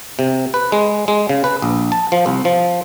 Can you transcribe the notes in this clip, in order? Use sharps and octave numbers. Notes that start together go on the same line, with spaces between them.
C3
B4
G#3
G#3
C#3
B4
A#1
A5
F3
C2
F3